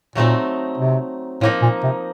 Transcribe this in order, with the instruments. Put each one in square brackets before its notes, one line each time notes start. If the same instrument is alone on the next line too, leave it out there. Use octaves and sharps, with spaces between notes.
[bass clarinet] A#2 [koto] F#3 A3 C4 D#4
[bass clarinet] C3
[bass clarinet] A2 [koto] F3 A#3 D#4
[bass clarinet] A#2
C3